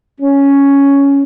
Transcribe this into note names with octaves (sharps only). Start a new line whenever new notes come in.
C#4